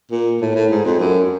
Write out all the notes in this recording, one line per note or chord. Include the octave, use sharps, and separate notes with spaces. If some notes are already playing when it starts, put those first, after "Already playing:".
A#2
A2
A2
G#2
F2
F#2